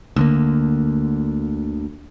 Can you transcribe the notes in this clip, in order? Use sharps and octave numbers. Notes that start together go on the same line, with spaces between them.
D2 D3 A#3